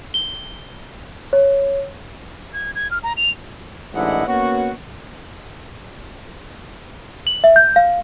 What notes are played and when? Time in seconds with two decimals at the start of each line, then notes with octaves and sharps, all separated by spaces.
0.14 G7
1.33 C#5
2.53 G#6
2.75 G#6
2.91 F6
3.03 A#5
3.17 F7
3.94 A1 G#2 D4 E4 D#5 F#5
4.26 A#3 B3 C#4 F#4
7.27 F#7
7.44 E5
7.56 G6
7.76 F5